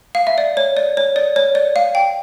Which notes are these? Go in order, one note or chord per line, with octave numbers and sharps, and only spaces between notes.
F5
E5
D5
C#5
D5
C#5
D5
C#5
D5
F5
G5